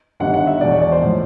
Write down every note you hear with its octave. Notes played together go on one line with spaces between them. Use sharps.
G1 G2 D#3 F#5
F#5
E5
E2 B2 D5
C#5
D5
C5
A2 F3